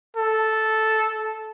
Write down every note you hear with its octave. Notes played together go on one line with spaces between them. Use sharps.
A4